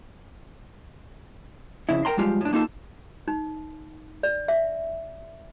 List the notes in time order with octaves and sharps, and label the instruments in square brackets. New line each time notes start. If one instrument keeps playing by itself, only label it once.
[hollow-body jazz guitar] F2 C#3 E4
A#4 G5 A#5 C6
F3 G3 G#3 F4 G4
A2 D4
A#3 D#4 F4 A4
[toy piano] D#4
D5
E5